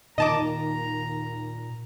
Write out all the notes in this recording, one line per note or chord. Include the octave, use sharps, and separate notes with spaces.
D#2 A#2 D#5 A5 A#5 D6